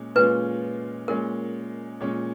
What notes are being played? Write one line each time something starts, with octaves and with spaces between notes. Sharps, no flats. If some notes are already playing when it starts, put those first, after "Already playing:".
Already playing: A#2 G#3 C#4
A#2 G#3 C#4 F4 B4
A#2 G#3 C#4 A#4
A#2 G#3 C#4